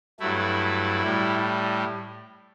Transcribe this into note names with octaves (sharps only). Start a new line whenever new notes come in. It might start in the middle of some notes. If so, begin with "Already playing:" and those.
G2 F#3 A3 E4
A2 G3